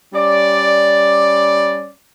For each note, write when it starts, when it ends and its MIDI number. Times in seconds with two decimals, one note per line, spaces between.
0.14 1.91 55
0.14 1.91 61
0.14 1.91 74